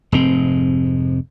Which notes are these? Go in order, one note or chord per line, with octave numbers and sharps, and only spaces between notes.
F1 G#2 C4